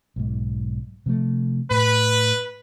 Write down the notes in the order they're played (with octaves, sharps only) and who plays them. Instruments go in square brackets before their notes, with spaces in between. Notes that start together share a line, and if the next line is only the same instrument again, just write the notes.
[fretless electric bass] B1 G#2
C3 F3 A3
[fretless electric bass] A2 [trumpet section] B4